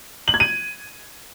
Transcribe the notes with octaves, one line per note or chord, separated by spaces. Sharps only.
F#7
G#6
D#7